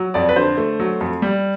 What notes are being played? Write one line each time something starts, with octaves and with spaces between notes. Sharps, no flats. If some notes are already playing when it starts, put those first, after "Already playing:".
Already playing: F#3
F2 D5
B4
D3 C5
A3
F#3
F2
G3